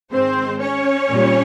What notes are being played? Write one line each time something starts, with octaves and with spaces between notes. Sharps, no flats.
G#2 D#3 G#3 C4 C5
C#4 C#5
A#2 G3